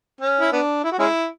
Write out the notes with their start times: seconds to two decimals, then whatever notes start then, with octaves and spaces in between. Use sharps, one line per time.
0.21 C#4
0.40 E4
0.53 B3 D4
0.84 E4
0.92 F#4
0.99 G#3 C#4 E4